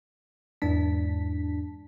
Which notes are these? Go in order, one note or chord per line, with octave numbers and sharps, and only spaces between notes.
E2 G#2 E3 D4 A5 B6